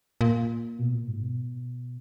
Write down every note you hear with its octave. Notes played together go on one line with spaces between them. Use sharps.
A#2
B2
A#2
G#2
B2